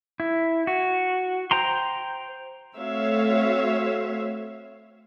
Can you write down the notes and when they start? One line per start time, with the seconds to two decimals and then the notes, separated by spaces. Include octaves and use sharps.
0.20 E4
0.67 F#4
1.51 C5 G5 A#5 C6
2.77 A3 C4 F#4 C#5 E5 F5